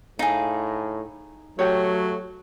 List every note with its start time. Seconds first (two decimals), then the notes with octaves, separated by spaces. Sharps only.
0.19 A2 D#4 G#4 F5
1.59 F#3 A3 G4 C#5